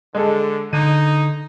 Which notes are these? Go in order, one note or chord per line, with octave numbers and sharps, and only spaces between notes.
D3 G#3 A4
D3 D#4 D#7